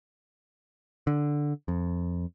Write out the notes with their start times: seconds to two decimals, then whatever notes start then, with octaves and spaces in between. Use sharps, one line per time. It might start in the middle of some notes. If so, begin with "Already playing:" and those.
1.07 D3
1.68 F2